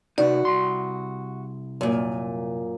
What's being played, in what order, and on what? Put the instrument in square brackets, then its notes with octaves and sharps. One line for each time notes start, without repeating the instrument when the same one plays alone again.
[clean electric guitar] C3 D#4 [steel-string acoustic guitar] F#4 [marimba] D5
[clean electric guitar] C2 C6
[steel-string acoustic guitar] F#2 A#2